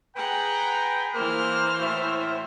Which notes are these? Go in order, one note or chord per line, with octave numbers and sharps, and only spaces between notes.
G#4 B4 F#5 G5 A#5
E3 A#3 C5 F6
A2 F#4 E5